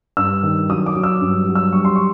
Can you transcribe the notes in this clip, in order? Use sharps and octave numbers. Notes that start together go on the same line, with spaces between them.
G2 E6
D#3
F#3 D#6
D6
F#3
E6
G2
F#3
E6
G3 C#6
C6
C#6